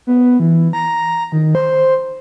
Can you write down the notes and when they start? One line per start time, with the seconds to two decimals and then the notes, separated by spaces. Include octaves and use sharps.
0.07 B3
0.40 E3
0.73 A#5
1.32 D#3
1.55 C5